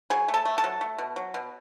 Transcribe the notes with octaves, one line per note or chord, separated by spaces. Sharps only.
F#3 G#4 G#5
A3
A4 A5
A3
A4 A5
F#3
A3
B2
F#3
B2